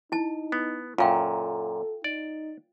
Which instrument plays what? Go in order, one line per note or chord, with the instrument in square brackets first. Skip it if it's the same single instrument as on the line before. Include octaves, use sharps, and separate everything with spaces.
[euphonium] D#4 [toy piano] E4 A5
[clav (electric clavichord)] B3
[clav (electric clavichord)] F#2 A#2 [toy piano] F4 F5 G5 [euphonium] A4
[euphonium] D#4 [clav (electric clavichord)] D5